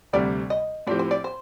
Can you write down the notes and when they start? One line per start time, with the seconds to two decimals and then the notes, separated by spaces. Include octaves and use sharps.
0.13 D2 C3 G3 D5
0.50 D#5
0.87 A2 F3 C4 G4 D5
0.99 C5
1.11 D5
1.24 C5